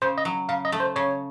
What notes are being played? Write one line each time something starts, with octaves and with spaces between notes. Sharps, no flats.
C#3 C5
D#5
F#3
C#3 F5
D#5
A3
C5
C#3 C#5